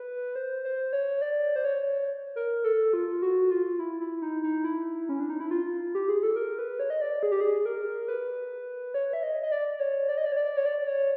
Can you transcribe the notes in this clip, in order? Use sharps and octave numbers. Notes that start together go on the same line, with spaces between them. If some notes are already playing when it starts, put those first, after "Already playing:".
Already playing: B4
C5
C5
C#5
D5
C5
C#5
A#4
A4
F4
F#4
F4
E4
E4
D#4
D#4
E4
C#4
D4
D#4
E4
F4
G4
G#4
A4
A#4
B4
C#5
D#5
D5
G#4
G4
G#4
A#4
B4
C#5
E5
D#5
D#5
D5
C#5
D5
D#5
D5
C#5
D5
C#5
D5
C#5